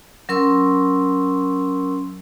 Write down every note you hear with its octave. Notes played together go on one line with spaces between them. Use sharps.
F#3 C#4 A#4 C6 C#6 E6